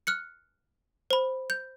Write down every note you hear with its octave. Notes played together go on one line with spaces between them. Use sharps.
F6 F#6 C#7
C5 B5
G6